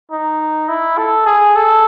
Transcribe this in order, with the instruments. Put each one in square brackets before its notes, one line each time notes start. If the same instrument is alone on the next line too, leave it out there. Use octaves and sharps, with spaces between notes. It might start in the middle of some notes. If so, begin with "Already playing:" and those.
[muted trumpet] D#4
E4
A4
G#4
A4